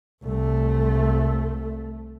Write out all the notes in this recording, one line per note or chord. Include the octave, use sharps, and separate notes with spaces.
C2 A3